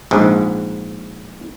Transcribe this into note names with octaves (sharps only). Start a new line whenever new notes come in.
A#1 G#2